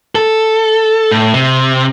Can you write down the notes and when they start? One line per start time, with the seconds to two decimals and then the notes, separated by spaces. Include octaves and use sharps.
0.15 A4
1.11 A2
1.34 C3